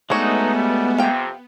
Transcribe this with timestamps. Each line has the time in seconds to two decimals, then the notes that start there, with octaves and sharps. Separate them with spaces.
0.10 G#3 A3 B3 D4 D#4 F#4 C#5
0.54 C#2 G3
0.98 F2 C3 F5 G5